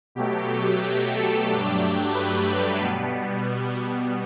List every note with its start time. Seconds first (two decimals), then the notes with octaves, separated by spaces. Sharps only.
0.15 B2 F#3 A3 G4
0.82 G4
1.15 A4
1.47 G2 F#3 A3 D4 G4
2.14 B4
2.80 B2 G3 B3